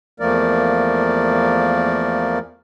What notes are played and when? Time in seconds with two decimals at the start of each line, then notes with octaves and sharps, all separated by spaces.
0.20 E2 F3 A3 A#3 A#4 D5